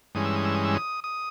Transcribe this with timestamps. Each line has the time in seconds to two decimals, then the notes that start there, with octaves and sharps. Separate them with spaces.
0.15 G2 E3 G#3 C#4 D#6
0.25 E6
0.36 D#6
0.45 E6
0.55 D#6
0.65 E6
0.75 D#6
1.04 D#6